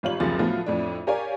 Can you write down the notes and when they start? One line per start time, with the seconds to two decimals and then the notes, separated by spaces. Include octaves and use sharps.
0.03 G#1 G3 F4 C#5 F#7
0.20 F#1 D2 C3 F3 G#4 A6
0.39 A2 F3 F#3 B3 F4
0.66 F2 A2 A3 D4
1.07 G4 A#4 C#5 D5 F5 G#5